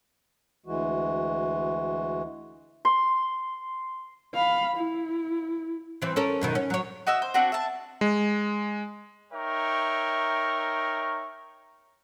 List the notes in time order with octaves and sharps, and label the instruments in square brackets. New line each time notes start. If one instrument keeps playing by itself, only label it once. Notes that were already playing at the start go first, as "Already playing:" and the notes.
[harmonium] D2 E3 G#3 F#4
[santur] C6
[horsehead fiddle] F5 B5
E4
[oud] E3 C4
C#4 A4 A#4
F#2 B2 D#3
C#4
F#3 C#5
[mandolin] F#4 D#5 E5 E6
C5
C4 D4 F#4
E5 A5
[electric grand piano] G#3
[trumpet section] D#4 A#4 C#5 E5 G5 C#6